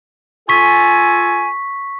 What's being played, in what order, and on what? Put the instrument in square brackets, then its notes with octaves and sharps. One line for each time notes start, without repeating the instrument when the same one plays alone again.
[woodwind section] F4 A4 G#5 [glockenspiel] C#6 B6